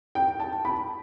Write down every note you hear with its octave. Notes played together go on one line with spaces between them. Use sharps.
G5
A5
B5